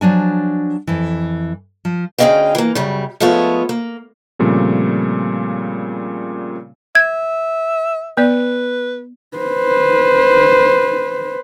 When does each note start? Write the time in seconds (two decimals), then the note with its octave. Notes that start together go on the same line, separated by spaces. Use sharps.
0.01 F3 F#3 D4 G#5
0.87 F2 E3
1.85 F3
2.18 D2 C#4 G#4 D#5 F5 G5
2.55 E3 A#3
2.75 F#2 C#3 G3
3.20 F3 G#3 A3 B3 F4 C#5
3.69 A#3
4.39 A#2 C#3 F3 G3 A3 C4
6.95 E5 G#6
8.17 B3 B4 D5
9.37 B4 C5